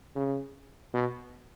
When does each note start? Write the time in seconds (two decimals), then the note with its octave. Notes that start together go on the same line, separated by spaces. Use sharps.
0.15 C#3
0.93 B2